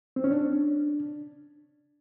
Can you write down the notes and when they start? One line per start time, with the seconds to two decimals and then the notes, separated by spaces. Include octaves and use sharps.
0.16 C4
0.24 C#4
0.31 D4